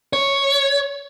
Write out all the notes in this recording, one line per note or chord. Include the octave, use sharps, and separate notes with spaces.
C#5